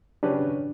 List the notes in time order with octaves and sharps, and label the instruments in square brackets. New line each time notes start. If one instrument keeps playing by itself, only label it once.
[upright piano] C#3 F#3 C#4 G4 B4 [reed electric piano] D4